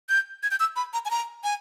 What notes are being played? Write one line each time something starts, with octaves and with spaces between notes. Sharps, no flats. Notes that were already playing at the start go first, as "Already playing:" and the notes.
G6
G#6
G6
E6
B5
A#5
G#5
A#5
G#5